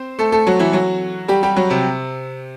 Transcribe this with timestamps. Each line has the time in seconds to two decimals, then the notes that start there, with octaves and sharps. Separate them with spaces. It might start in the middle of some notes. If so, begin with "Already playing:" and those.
Already playing: C4 C5
0.19 A3 A4
0.32 A3 A4
0.47 F#3 F#4
0.59 E3 E4
0.73 F#3 F#4
1.28 G3 G4
1.43 G3 G4
1.56 F#3 F#4
1.70 C3 C4